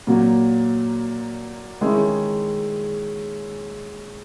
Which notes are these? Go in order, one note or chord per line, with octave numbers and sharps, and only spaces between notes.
A#2 F#3 A#3
D#3 G#3 C#4 E4 G#4